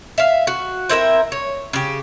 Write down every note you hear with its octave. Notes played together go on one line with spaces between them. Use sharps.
E5 F5
F#4
C4 E4 A#4 E5
C#5
C#3 G4